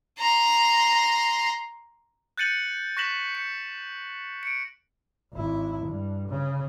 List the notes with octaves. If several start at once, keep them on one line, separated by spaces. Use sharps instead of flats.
A#5 C6
F#6 G6 A6 C#7 D#7 F#7
C#6 F#6 A#6 B6 E7 F#7
C#7
C#7 D7
G#1 E4
G2
C#3